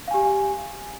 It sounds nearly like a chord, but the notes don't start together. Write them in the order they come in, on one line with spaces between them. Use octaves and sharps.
F5 G#5 G4